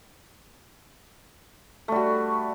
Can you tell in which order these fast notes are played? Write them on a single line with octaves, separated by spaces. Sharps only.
A3 G3 F#4